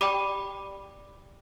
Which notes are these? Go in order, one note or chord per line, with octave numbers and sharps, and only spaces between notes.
G4 D5 G5 B5 D6